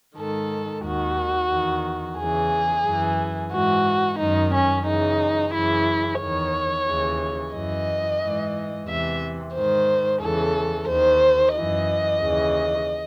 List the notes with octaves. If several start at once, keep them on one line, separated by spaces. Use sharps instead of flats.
G#2 D#3 A4
D#2 D#3 F#4
E2 D#3
E2 C#3 E3 G#4
F#2 E3
G#2 E3 F#4
F#2 D#3 D#4
C#4
F#2 C#3 E3 D#4
F#2 C#3 E3 E4
E2 D#3 C#5
D#2 C#3 E3
F#2 E3 D#5
G#2 E3
E2 C3 E3 E5
G#2 D#3 C5
E2 C#3 E3 A4
D#2 D#3 C5
F#2 E3 D#5
D#2 C#3 E3